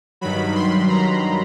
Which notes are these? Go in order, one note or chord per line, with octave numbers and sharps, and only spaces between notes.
G2 D#3 F#3 B5
C6
A#5